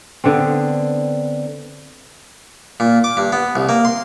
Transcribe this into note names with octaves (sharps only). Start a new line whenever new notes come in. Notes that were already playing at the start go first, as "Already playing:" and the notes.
D3 B3 C4
A#2
D6
G2
B3
C2
A#3
C6